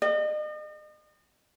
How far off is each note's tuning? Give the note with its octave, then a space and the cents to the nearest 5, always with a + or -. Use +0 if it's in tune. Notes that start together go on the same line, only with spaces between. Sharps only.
D#5 -40